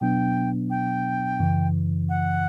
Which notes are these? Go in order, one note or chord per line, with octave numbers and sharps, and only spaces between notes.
B2 F#3 B3 D4 G5
G5
F#2 C#3 E3
F#5